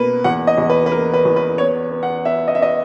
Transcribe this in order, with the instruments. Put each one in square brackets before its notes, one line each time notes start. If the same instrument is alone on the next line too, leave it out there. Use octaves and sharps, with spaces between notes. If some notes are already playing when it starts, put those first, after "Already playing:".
Already playing: [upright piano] B2 A#3 B4
E2 F#5
D#5
E2
B4
B4
A#3 A#4
B4
E2
B4
B3 C#5
B3
F#5
B3 E5
D#5
E5
B3 D#5